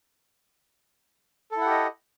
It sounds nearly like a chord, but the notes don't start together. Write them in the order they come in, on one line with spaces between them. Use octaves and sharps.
A4 E4 F#5 G4 D#5